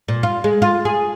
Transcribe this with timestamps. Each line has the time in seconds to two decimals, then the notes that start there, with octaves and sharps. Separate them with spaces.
0.08 A#2
0.23 F4
0.44 G#3
0.62 F4
0.85 G#4